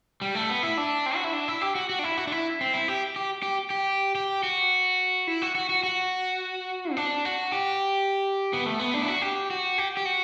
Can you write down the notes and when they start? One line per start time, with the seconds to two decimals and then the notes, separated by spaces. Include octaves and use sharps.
0.21 G3
0.35 A3
0.49 B3
0.63 E4
0.77 D4
1.06 C4
1.15 F#4
1.24 E4
1.33 D4
1.48 E4
1.61 G4
1.75 F#4
1.89 F#4
1.99 D4
2.04 E4
2.17 F#4
2.27 D4
2.32 E4
2.61 C4
2.74 E4
2.88 G4
3.16 G4
3.43 G4
3.70 G4
4.15 G4
4.43 F#4
5.27 E4
5.42 F#4
5.55 F#4
5.70 F#4
5.83 F#4
6.92 C4
6.97 D4
7.25 F#4
7.52 G4
8.53 B3
8.66 A3
8.79 B3
8.94 D4
9.02 E4
9.08 F#4
9.22 G4
9.50 F#4
9.78 G4
9.97 G4
10.05 F#4